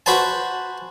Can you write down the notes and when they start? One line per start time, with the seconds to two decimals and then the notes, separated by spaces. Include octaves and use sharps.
0.06 F#4 B4 C5 G#5 A5